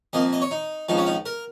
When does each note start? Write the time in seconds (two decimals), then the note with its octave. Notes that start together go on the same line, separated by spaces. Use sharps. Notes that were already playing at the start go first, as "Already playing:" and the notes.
0.13 F2 F3 A#3 D#5
0.33 D#5
0.42 C#5
0.51 D#4
0.89 C#2 C#3 F3 D#4
0.98 C#4
1.07 D#4
1.26 A#4